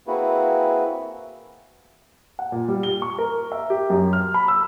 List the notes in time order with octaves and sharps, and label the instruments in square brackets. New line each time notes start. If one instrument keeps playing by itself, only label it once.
[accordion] A#3 C4 E4 F#4 G#4 B4
[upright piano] F#5
A#2
G3
G7
C#6
A#4
E5
G4
F#2
F6
B5
E6